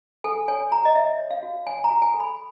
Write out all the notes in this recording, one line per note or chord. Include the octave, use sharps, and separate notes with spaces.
A4 G#5
C#5 G#5
F#4 A#5
D#5
C#5 E5
C#5
F5
F#4
C#5 G#5
A#5
F#4
G#5
A4
B5